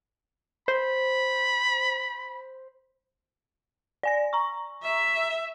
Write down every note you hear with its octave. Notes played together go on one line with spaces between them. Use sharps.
C5 B5
D5 G#5 A#6
A#5 C#6
E5